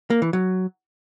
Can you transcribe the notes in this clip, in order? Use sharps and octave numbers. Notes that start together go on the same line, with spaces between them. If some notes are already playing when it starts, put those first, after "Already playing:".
A#3
E3
F#3